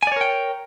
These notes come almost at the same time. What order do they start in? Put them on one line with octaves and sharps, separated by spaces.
G#5 D5 C#5 A#4 G5